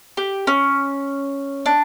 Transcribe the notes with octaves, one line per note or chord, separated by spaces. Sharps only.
G4
C#4
D4